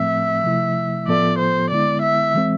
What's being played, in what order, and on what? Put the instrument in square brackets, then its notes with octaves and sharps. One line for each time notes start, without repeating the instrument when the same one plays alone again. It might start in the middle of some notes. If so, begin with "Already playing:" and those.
Already playing: [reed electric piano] A2 F3 A3 C4 [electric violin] E5
[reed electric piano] C3 F3 A3 E4
[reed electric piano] A2 F3 B3 F4 A4 [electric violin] D5
[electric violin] C5
[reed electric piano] D3 G#3 B3 E4 [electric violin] D5
[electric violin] E5
[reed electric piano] E3 G#3 C4